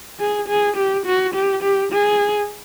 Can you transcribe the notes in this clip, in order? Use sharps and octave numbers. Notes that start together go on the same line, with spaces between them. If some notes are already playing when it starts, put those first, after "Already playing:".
G#4
G#4
G4
F#4
G4
G4
G#4